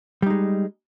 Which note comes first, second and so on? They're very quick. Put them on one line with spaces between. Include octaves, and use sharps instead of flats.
G3 D#4 G#3